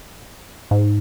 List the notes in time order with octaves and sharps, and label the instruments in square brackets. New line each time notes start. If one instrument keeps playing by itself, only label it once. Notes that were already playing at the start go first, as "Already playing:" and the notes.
[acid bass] G#2